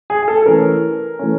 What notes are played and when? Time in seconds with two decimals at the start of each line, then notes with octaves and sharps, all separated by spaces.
0.10 G#4
0.23 G#4
0.28 A4
0.42 A4
0.46 E3 A3 C#4 A#4
1.19 E3 A3 C#4